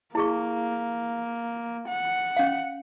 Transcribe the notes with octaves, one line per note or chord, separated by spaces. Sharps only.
A#3 E4 G#4 C#6
F#5
C#4 F5